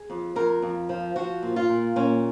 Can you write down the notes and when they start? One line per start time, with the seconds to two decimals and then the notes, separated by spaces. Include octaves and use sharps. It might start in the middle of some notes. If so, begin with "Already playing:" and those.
Already playing: G#4
0.10 F2
0.36 F2 A#4
0.62 F2
0.89 F3
1.16 F3 F#4
1.43 A#2
1.56 F4
1.69 A#2
1.96 A#2 C#4